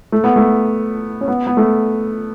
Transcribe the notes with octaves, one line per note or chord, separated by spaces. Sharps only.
A3
B3
A3
C#4
B3
B3
A3